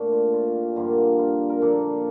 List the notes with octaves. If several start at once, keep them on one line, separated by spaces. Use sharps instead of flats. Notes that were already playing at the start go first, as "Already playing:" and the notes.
Already playing: A#2 A3 D4
F4
F4
G4
G2 D3 F3 A#3 F4
F4
A#4
A#2 F3 A#3 A4